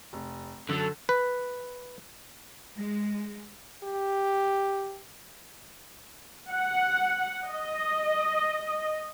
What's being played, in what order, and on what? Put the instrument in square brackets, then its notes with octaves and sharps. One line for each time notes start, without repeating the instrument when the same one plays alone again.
[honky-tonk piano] F1
[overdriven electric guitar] F#2 F#3 [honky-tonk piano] D3 [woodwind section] A4
[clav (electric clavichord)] B4
[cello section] G#3
[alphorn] G4
[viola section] F#5
D#5